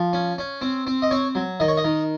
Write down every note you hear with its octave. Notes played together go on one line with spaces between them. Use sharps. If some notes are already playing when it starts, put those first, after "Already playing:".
Already playing: F3
C#4
C#4
C4
C4
D#5
C4 C#5
F#3
D#3 D#5
C#5
D#5
D#3